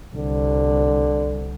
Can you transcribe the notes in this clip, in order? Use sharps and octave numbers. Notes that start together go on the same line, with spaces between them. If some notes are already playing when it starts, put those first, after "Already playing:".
C2 D3